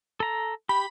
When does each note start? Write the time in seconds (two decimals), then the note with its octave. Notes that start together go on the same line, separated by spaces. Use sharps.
0.20 A4 A#5
0.69 G4 B5